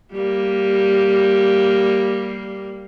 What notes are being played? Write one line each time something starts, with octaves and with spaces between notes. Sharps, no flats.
G3 A#3